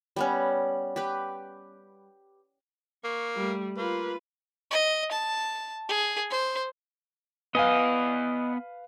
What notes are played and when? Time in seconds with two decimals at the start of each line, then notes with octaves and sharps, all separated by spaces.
0.16 G3 B3 C#4
0.96 G4 B4
3.04 A#3 C#6
3.36 G3 A3
3.78 A#3 F4 B4
4.71 D#5
5.12 A5
5.89 G#4
6.31 C5
7.55 B3 B4 D#5 F5 G#5